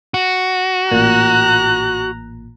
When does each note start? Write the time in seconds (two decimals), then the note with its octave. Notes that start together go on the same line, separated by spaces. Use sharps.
0.14 F#4
0.91 A1 A#2 A#5 F#6